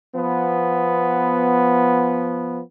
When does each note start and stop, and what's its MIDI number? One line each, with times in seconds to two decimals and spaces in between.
0.15 2.60 53
0.15 2.60 59